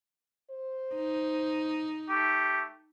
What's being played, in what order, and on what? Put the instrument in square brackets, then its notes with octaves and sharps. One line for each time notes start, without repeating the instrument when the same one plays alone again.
[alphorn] C5
[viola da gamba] D#4
[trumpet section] A3 G4